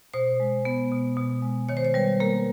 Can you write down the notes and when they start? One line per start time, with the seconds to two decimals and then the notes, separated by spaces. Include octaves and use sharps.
0.14 B2 C5
0.40 G#3
0.65 B3
0.92 B2
1.17 B2
1.42 G#3
1.69 D#3 C#5
1.77 C5
1.85 C#5
1.94 G3 B4
2.20 A#3 A#4